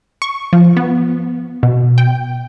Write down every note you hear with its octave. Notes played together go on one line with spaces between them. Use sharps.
C#6
F3
B3
B2
G5